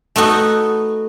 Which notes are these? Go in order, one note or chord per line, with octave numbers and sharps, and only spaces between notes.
A3 B3 D#4 F#4